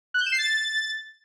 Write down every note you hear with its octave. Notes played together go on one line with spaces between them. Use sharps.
F#6
G6
E7
C7
A6